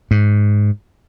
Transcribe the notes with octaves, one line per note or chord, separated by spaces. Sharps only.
G#2